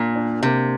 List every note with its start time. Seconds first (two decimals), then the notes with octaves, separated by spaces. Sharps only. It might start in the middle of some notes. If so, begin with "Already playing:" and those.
Already playing: A#2 A#3 D4
0.16 D4
0.43 C3 A#3